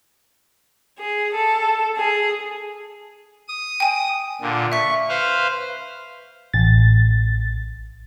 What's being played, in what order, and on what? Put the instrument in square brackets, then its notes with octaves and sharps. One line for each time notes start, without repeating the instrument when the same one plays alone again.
[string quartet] G#4
A4
G#4
[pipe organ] D#6
[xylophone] G5 G#5
[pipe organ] A#2 D3
[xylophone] E5 B6 [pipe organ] C#6
[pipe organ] B4 C5 F5
[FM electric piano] A1 A6